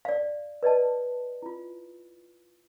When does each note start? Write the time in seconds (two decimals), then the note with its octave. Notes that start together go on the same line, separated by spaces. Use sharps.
0.05 D5 F5
0.63 B4 D5 D#5 A5
1.42 E4 F4